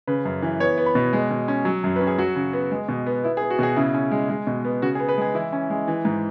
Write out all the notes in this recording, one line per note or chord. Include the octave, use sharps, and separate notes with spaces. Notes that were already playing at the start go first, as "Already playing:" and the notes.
C#3 B4
F#2
E3
B3 C#5
B3
B5
B2
G#3
B2
C#4
F#3
F#2
C#4 B4
G#4
F#3 F#4
C#3
B3
G#3
B2
B3
B3 E4
G#4
B3
F#4
B2 G#4
C#3 E4
C#4
G#3
G#3
B2
B3
C#3 F#4
G#4
B3
B4
G#3 G#4
E3 E4
C#4
G#3
E3
G#2